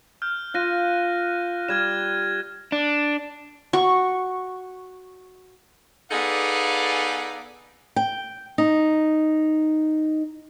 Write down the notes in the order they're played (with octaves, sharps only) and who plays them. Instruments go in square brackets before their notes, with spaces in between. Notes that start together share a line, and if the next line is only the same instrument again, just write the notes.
[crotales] F6 G6
[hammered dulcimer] F4 [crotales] F#6 A#6 D#7
[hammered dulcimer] G3 [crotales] F6 G#6 E7
[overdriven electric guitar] D4
[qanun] F#4 [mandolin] C#6
[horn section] B3 D#4 G#4 A4 D5 F5
[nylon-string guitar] G5
D#4